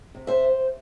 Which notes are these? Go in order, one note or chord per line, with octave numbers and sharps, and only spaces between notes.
C3
C5 E5